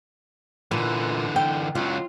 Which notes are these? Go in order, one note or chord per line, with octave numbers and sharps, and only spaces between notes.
A#2 D3 E3
G5
C#2 F#3 F4